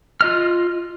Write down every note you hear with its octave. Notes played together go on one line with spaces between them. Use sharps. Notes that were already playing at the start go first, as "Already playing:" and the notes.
F4 D#5 F6